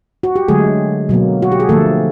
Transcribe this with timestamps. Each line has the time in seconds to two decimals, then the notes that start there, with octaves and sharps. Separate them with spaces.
0.23 F#4
0.36 G4
0.48 D3 F#3 G#3 A3 G#4
1.09 B2 F#3 A#3
1.42 F#4
1.52 G4
1.60 G#4
1.69 D3 F3 A3 A#3 A4